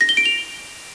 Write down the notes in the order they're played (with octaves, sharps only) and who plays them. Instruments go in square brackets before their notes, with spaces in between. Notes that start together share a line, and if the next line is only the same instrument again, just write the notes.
[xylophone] A#6
G7
D7
F7